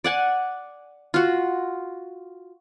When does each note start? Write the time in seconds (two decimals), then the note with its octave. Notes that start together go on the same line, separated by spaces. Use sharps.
0.04 D5 F#5 G#5
1.14 F4 F#4